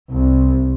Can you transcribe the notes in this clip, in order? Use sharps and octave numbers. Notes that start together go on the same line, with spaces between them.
C2